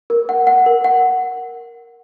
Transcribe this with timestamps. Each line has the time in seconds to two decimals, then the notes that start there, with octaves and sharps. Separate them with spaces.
0.10 A#4
0.29 F#5
0.47 F#5
0.66 A#4
0.84 F#5